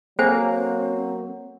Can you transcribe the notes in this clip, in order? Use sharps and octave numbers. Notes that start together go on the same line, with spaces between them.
F#3 A#3 C4 A4 C5 G#5